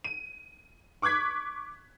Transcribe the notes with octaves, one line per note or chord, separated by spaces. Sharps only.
D#7
C#6 D6 F#6 G#6 B6